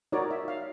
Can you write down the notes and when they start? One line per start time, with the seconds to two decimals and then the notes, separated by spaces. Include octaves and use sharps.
0.12 D#4 F#4 A#4 C#5 D5
0.31 E5
0.48 F5